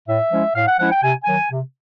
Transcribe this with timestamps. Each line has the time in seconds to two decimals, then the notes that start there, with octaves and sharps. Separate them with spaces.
0.08 A2 E5
0.32 F3 G#3 C#4 E4
0.55 A2 F5
0.68 F#5
0.79 F3 G#3 C#4 E4 F#5
0.92 G5
1.03 C3 G#5
1.24 D#3 F#3 G#5
1.51 C3